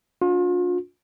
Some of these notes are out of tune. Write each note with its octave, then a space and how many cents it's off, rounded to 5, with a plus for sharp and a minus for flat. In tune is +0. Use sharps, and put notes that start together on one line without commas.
D4 -25 F4 +40